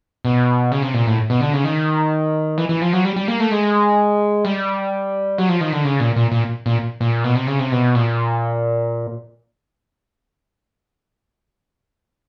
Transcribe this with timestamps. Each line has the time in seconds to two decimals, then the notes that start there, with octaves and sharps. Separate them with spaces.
0.25 B2
0.72 C#3
0.82 C3
0.94 A#2
1.07 A2
1.30 B2
1.41 D3
1.53 C#3
1.65 D#3
2.58 E3
2.69 E3
2.82 F3
2.93 F#3
3.05 G3
3.16 G3
3.28 A#3
3.40 A3
3.51 G#3
4.45 G3
5.38 F#3
5.49 F3
5.61 D#3
5.73 D3
5.84 C#3
6.00 A#2
6.16 A#2
6.31 A#2
6.66 A#2
7.01 A#2
7.24 B2
7.36 C3
7.47 C#3
7.59 C3
7.72 B2
7.95 A#2